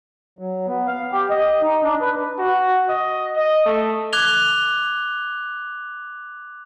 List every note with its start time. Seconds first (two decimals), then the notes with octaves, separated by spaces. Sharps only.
0.39 F#3
0.67 B3
0.87 F5
1.12 G4
1.30 D#5
1.62 D#4
1.83 D4
2.01 B4
2.38 F#4
2.89 D#5
3.36 D#5
3.66 A3
4.13 D6 F#6 G#6 F7 G7